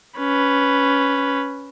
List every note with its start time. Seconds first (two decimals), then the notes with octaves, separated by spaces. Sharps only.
0.19 C#4 B4